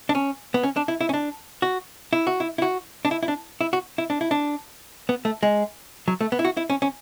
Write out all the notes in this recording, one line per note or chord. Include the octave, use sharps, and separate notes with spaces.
D4
C#4
B3
C#4
D4
E4
E4
C#4
D4
F#4
E4
F#4
E4
E4
F#4
D4
E4
E4
D4
E4
F#4
E4
D4
E4
D4
B3
A3
G#3
F#3
A3
B3
E4
F#4
E4
C#4
C#4